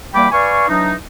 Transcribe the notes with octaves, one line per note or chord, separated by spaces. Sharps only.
E2 G3 A#3 G5 B5 D6
B4 D5 F5 G#5 C#6
E3 F#3 D4 D#4